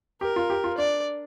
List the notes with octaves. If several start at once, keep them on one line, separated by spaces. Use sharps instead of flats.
G4 A#4
F4
G4
F4
D4 D5